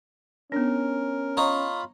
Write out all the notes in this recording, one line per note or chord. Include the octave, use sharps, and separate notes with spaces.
B3 C#4 D4 A#4
D#4 F4 C#5 D#5 F5 A#5 B5